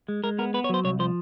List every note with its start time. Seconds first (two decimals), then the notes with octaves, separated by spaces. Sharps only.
0.08 G#3
0.24 G#3 A#4
0.39 B3 A#4
0.54 B3 B4
0.64 C#5
0.69 F#3 C5
0.84 C2 C#5
0.99 F3 C5